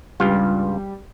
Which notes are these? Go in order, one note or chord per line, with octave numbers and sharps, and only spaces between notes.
C#2 G2 G3 F4